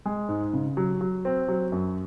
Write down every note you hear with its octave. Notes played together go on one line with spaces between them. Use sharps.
G#3
G#2
C#3
F#3
F#3
C4
F#3
F#2